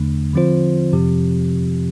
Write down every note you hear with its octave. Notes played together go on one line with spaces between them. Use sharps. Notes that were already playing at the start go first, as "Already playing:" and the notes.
Already playing: E2 D3 A3 D4
D3 F3 C4 F4 C5
F2 C3 F3 C4 G4